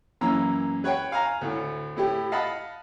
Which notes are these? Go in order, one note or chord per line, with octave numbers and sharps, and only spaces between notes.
F#2 E3 A#3 C#4 A#5 E6
B4 C#5 F#5 G5
F5 G#5 A#5
D2 A2
A2 E4 G4
D#5 F5 F#5 A5 B5 D#6